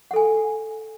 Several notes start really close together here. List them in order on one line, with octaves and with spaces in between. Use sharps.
F#5 A4 G#5